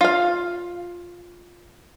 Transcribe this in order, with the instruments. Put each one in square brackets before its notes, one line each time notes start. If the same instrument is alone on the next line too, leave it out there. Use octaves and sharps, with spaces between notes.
[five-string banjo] F4 F5